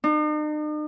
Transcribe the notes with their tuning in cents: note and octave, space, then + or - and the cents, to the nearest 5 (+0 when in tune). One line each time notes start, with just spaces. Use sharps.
D#4 -45